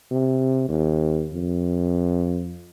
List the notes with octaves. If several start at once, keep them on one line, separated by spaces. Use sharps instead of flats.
C3
D#2
F2